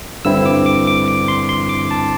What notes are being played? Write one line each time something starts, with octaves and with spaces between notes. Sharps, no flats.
G2 D3 C4 E4 E6
D6
D6
D6
D6
C6
C6
D6
A5